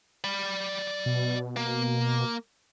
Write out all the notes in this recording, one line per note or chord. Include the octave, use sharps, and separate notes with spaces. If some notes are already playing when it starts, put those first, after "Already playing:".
D5 B5
B2
A#3